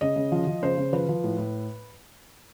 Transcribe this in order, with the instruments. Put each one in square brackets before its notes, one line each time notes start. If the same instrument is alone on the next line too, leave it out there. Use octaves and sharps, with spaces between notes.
[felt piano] C#3 D#5
C#3
F3
F3
C#3 C5
C#3
F3 B4
F3
A2
A2